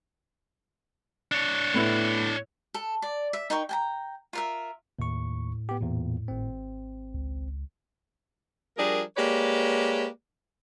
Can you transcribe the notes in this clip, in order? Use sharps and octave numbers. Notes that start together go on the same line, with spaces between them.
D4 C#5
A2 B3 E4
A4
D5
E5
D#4 A#4 G5 C#6
G5 G#5 A#5
F4 A#4 E5
D#2 A2 C#6
B3 G4
E2 A#2
G#1 C4
C#2
F3 G3 D4 G#4 A#4
G#3 A#3 G4 B4 C#5 D5